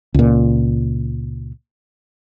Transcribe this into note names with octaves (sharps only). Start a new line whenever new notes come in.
C#2 A#2